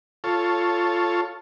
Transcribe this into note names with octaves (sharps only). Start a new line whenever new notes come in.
F4 A4 C#5